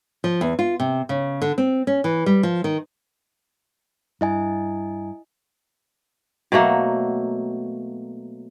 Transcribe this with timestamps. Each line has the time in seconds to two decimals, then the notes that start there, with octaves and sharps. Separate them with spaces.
0.24 F3
0.41 E2
0.59 F4
0.80 C3
1.09 C#3
1.42 D3
1.58 C4
1.87 C#4
2.04 E3
2.26 G3
2.43 F3
2.64 D#3
4.21 G2 E4 D#5 G#5
6.52 B2 F#3 A3 A#3